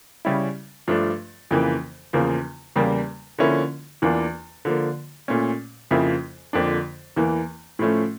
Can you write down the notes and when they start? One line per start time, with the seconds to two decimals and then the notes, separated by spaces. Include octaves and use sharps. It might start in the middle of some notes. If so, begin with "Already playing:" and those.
0.25 C#3 G3 C#4 E4
0.88 G2 F3 A3 D4
1.51 F2 C#3 E3 A#3
2.13 E2 C#3 F3 A#3
2.76 E2 C#3 G3 A#3
3.39 D3 F3 A#3 C#4 E4
4.02 E2 E3 A#3 D4 F4
4.65 D3 F3 A#3
5.28 A#2 A3 C#4
5.91 F2 C#3 F3 A#3 E4
6.53 F2 D3 F3 A#3 D4
7.16 E2 E3 A#3
7.79 A2 F3 A3 C#4